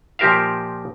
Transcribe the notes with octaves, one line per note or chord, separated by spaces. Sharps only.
A#2 F3 G4 A#4 E5 F5